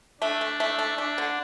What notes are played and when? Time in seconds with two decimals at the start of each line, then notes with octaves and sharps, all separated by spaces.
0.21 A3 D4
0.41 A3
0.60 A3
0.79 A3
0.98 A3 D4
1.18 D3